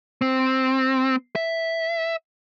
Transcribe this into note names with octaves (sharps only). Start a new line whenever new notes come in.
C4
E5